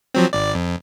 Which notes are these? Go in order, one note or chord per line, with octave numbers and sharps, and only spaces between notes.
F3 F#3 C4
G#1 D5
F2